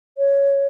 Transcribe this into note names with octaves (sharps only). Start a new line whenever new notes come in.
C#5